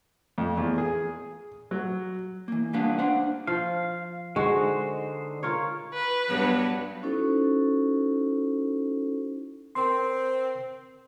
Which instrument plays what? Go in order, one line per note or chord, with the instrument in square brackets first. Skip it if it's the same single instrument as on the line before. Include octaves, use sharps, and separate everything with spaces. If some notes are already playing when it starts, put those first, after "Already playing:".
[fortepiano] F2
E2
G#4
F#3
[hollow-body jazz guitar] E3 A#3
C#2 G3 A#3 B3 D4 F5
D4 C5 F5 F#5
[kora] F3 [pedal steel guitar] F5
[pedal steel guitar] D3 D#4 C5 [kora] G#3 F#4
[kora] F4 A#4 C#5
[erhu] B4
[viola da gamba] G2 F#3 B3
[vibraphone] C#4 D#4 E4 F#4 A4 C5
[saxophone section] C4 [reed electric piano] A#4 C6